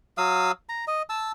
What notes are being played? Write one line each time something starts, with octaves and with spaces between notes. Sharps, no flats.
F#3 F5 D#6 E6
A#5
D#5
A5 E6